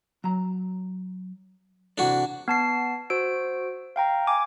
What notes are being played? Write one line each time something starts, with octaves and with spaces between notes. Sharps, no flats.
F#3 A#5
C3 E3 D4 F#4 A4
B3 A5 C7
F#4 C5 E6 D7
F5 G5 A#5
G#5 D6